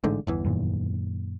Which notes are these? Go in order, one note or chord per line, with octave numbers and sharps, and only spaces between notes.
A1 G#2 D3
G1 E2 E3
F#2 A#2 D#3